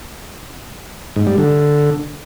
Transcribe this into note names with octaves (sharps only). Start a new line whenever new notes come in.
G#2
G3
D3